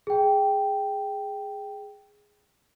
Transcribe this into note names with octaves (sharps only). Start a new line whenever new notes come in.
G#4 G5